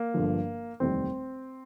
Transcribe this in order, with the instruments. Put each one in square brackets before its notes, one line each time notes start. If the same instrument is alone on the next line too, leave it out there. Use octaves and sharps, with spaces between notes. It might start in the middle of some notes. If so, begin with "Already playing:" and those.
Already playing: [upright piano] A#3
G1 G2 D3 F3
F1 D#2 D#3 G3 C4